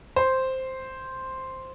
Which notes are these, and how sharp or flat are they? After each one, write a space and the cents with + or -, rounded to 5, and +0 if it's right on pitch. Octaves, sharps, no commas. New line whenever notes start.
C5 +0